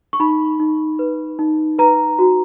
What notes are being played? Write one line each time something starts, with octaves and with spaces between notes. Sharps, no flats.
C#6
D#4 B5
D#4
B4
D#4
B4 A#5
F#4